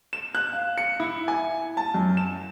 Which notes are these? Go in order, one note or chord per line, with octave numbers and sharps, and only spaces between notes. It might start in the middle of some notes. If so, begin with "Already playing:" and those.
E7
F#6
F5
C#7
E4
G#5
A5
F#2
E7